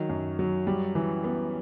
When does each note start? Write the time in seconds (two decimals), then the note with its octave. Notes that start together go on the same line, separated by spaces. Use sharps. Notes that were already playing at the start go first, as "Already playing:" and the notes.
Already playing: D#3 F#3
0.09 F#2
0.39 F#3
0.67 G3
0.95 E3
1.24 B3